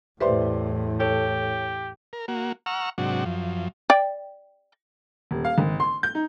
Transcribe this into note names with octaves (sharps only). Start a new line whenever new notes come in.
E2 A2 G4 B4 C5 D5 E5 C6
G4 A4 C#5
A#4
A#3 F#4
F#5 A#5 C#6 E6 F6
G#2 C3 F#3 D4 F#4
F#2 F3
D5 G5
D#1
F5
G#1
C6
G6
D#4